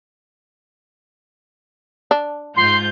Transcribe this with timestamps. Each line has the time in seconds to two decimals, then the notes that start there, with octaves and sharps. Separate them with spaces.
2.11 D4
2.56 G#2 F4 C6 G6